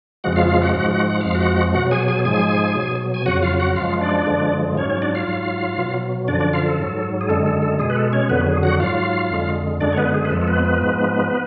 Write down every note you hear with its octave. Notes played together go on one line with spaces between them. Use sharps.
F2 C#3 F3 G#3 F#4 F#5
F4 F5
F4 F5
F#4 F#5
G#2 F3 G#3 F#4 F#5
F#4 F#5
F#5
F2 F3 G#3 F5
F#4 F#5
B2 F#3 F#4 F#5
G#4 G#5
G#4 G#5
G#2 F3 G#3 G#4 G#5
B2 F#3
G#5
F2 C#3 F#3 F#4 F#5
F4 F5
F#4 F#5
F#2 F3 G#3 F4 F5
D4 D5
F#2 D3 F3 G#3
G#2 F#3 C#4 C#5
C#4 C#5
D4 D5
F4 F5
G#2 F#3
B2 F#3
F#2 D3 F3 D4 D5
D4 D5
F4 F5
A4
G#2 F#3
G#4
F#2 D3 G#3 A4
A4
A4
B2 G#3 G#4
B4
A4
C#4 C#5
F2 D3 F#3 B3 B4
G#4
F#4 F#5
G#2 F#3 F4 F5
F2 D3 G#3
F#2 D3 G#3 D4 D5
C#5
B3 B4
G#4
B4
F2 F3 G#3 A4
A4
B3 B4
B3 B4
G#2 F3 G#3